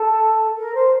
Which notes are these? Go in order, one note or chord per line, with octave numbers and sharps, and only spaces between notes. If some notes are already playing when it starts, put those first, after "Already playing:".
Already playing: A4
A#4
C5